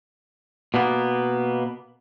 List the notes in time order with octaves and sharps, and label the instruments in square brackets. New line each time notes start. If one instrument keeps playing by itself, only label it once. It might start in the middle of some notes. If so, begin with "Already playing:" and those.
[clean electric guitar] B2 A#3 B3